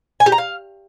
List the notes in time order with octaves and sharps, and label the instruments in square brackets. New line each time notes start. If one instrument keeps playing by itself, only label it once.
[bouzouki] G#5
G4
A#5
F5